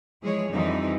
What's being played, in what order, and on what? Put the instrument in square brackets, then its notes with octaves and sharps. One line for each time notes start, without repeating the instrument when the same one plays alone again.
[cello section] E3 F3 G#3 G#4 C#5
F2 D3 E3 F3 G3 D#4